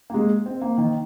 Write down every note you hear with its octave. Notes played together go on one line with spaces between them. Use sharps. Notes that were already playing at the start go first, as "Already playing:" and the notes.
A#3
G#3
C4
A#3
D#3